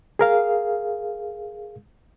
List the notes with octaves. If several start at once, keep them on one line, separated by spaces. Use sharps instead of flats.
G#4 A#4 F5